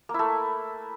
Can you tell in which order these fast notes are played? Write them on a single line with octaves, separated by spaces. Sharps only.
A#3 E4 A3